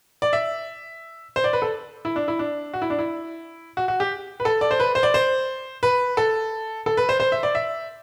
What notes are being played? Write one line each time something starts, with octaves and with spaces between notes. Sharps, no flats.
D5
E5
C5
D5
B4
A4
E4
D4
E4
D4
F#4
E4
D4
E4
F#4
F#4
G4
B4
A4
D5
C5
B4
C5
D5
C5
B4
A4
A4
B4
C5
C5
E5
D5
E5